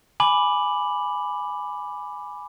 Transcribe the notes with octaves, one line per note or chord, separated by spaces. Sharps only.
G#5 B5 D6 F#7